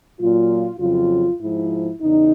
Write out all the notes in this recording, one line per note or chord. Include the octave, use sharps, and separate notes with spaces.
A#2 F#3 F4
F2 C#3 F#3 F4
G#2 F3 E4
E2 C#3 D#4